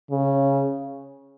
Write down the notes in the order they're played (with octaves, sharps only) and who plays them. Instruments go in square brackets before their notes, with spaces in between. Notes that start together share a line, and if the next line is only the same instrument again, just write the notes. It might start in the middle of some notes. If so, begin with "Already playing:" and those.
[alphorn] C#3